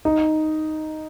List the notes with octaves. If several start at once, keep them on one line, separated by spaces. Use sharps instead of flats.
D#4